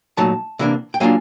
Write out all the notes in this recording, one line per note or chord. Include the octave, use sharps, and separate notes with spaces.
A#2 F#3 A3 D#4 A5
C3 E3 G3 A#3 D4
G5
F#3 A#3 D4 F4 G#5